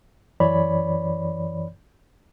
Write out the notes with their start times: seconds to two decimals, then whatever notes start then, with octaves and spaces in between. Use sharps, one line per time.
0.40 F#2 E3 C#5 D5 B5